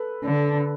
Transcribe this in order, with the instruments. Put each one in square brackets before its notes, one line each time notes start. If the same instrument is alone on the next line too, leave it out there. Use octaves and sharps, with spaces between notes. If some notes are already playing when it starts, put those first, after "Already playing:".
Already playing: [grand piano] A4 B4
[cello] D3